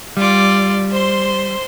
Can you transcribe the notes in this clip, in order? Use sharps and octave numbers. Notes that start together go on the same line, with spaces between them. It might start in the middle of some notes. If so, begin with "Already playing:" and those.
G3 F4 D5
C5 C6